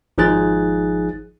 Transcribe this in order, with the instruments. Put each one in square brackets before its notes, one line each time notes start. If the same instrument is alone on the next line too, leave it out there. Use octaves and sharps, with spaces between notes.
[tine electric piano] G#1 F3 D#4 G#4 F#6 A6